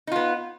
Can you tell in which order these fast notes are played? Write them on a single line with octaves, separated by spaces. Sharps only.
D#4 F4 B3